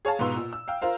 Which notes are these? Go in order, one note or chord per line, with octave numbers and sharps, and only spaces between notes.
G#4 C#5 F5 A5
G#2 B2 F4 B4 C6 E6
A#2
E6
F5 G5
F4 A#4 C5 F5